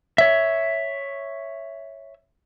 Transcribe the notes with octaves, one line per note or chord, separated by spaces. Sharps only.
C#5 E5